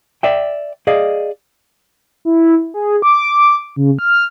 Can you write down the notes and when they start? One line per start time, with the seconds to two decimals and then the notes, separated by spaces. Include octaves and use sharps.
0.23 D5 E5 G5
0.87 G#4 D5 D#5 F5
2.25 E4
2.74 G#4
3.02 D6
3.76 C#3
3.99 F6